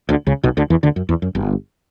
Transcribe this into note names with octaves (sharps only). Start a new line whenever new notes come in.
D2 D3
C#2 C#3
B1 B2
D2 D3
E2 E3
D2 D3
F#2
E2
F#2
G1 G2